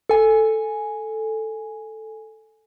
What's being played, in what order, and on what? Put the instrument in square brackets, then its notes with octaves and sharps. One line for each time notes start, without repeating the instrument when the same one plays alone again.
[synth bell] A4 G#5